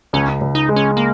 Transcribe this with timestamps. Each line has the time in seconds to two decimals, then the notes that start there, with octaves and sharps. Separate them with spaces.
0.13 C#2 C#4
0.41 C#2
0.55 D#4
0.69 G#3
0.76 C#4
0.97 A#3